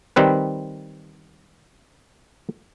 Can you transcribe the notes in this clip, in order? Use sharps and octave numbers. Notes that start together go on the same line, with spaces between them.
D#3 G3 C4 B4